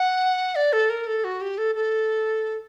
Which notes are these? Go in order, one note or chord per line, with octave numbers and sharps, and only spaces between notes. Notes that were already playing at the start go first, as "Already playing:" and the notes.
Already playing: F#5
D5
A4
A#4
A4
F#4
G4
A4
A4